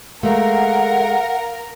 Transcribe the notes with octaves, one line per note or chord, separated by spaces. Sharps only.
G#3 A3 A#4 F5 F#5